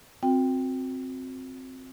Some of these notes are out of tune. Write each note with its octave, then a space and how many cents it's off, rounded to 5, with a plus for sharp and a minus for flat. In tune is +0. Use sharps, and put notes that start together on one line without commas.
C4 +0 F#4 -40 G5 +5